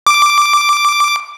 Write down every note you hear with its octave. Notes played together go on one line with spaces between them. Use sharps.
D6